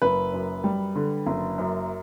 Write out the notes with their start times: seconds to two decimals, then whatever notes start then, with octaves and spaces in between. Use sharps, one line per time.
0.02 F#1 B4
0.33 F#2
0.64 G3
0.95 D3
1.27 F#1
1.58 F#2